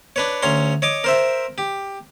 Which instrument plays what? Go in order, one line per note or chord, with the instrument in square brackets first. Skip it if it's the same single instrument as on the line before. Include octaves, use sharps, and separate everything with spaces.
[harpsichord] D4 B4 C#5
D2 C#4 C#5 A#5 C6
C#5 D#5 D6
A#4 C5 E5
G4